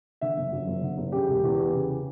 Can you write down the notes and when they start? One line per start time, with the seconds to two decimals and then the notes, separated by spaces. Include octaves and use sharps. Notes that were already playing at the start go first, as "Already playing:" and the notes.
0.21 D3 E5
0.37 F#1
0.53 F#2
0.67 F#1
0.83 D3
0.98 F#1
1.12 C#3 G4
1.28 E1
1.44 E2
1.59 E3
1.74 C#3